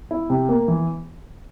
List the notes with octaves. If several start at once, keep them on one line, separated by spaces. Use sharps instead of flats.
E4
C3
A#3
E3